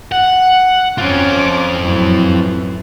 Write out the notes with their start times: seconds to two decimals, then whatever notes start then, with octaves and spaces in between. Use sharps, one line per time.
0.12 F#5
0.98 C4 C#4 F4 D6
1.79 F#2 A2 E3